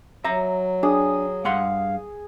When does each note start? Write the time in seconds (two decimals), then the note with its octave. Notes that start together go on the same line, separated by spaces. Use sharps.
0.24 F#3 E5 A#5
0.83 D4 G#4 D#6
1.45 G2 F5 F#5 C6